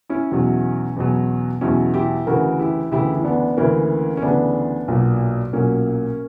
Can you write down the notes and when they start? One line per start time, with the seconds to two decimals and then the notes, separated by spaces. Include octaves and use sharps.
0.09 C#4 E4
0.31 E2 B2 F#3
0.96 E2 B2 F#3
1.61 E2 B2 F#3 C#4 E4
1.94 E4 G4
2.27 D2 C#3 E3 F#4 A#4
2.59 E4 G4
2.92 D2 C#3 E3 E4 G4
3.13 E4
3.24 B3 D4
3.57 D2 C#3 E3 A#3 C#4
4.17 C#4
4.22 D2 C#3 E3 B3 D4
4.88 B1 A#2 F#3
5.53 B1 A#2 F#3 A#3 C#4